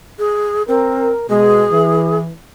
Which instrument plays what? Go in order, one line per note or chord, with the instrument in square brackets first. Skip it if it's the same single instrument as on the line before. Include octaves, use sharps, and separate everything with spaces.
[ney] G#4
[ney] C4 [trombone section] A#4
[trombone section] B2 G#3 [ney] G#4
[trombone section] E3